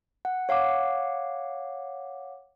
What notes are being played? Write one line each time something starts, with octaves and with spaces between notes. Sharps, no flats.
F#5
C#5 F5 F#5 D6